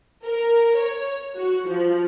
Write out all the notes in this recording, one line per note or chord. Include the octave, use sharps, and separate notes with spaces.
A#4
C#5
F#4
F3